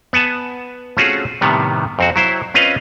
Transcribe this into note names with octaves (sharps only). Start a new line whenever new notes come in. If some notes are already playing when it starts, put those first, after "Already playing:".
B3 F#5 G#5 A5
A3 C4 C#4 F4 F#4 G#4
A2 C3 D#3 G3 B3
F2 C4 F#4
F#3 E4 C5
C4 C#4 F4 B4 D#5 F5